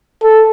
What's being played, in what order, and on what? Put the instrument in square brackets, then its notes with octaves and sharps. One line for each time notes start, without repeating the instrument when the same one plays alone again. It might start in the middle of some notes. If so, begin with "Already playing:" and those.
[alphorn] A4